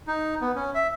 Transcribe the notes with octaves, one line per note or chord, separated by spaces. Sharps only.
D#4
B3
C#4
E5